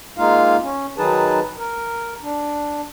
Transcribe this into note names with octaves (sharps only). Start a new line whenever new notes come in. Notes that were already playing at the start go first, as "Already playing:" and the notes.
G#3 A#3 D#4 F4 F5
C#4
D#3 F#3 D#4 G#4 B4 A5
A#4
D4